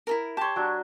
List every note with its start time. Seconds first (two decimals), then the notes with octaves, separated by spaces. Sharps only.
0.07 E4 A4 A#4
0.37 G4 C#5 A5 C6
0.56 F#3 D4